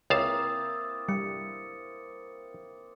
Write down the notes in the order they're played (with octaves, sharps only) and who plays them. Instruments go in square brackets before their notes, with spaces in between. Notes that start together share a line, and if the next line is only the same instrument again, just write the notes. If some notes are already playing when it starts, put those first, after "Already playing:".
[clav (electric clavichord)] C#2 F5 A5 [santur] A#3 C4 E4 [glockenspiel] D#6 A6
[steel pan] G3 [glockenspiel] C#7